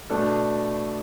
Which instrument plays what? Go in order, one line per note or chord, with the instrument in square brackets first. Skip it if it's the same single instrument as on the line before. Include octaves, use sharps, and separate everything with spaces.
[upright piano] B2 A3 D4 A4